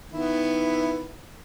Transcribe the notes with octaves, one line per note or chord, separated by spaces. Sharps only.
D#3 B3 E4